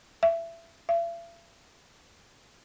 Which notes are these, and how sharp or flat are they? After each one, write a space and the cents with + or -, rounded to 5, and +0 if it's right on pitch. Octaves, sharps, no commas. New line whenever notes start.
E5 +20
E5 +45